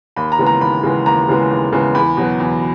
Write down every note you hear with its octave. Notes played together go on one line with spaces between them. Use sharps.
D#2 B5
A#5
C#3 E3 G#3 B3
A#5
D#2 B5
C#3 E3 G#3 B3
D#2 A#5
C#3 E3 G#3 B3
D#2
C#3 E3 G#3 B3
E2 B5
B2 F#3 B3
E2